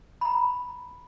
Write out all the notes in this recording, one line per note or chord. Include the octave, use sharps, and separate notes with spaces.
A#5 B5